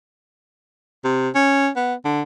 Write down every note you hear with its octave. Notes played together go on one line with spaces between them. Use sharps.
C3
C#4
B3
D3